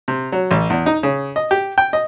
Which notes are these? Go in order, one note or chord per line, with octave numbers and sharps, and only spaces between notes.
C3
F#3
A1
E2
D#4
C#3
D#5
G4
G5
D#5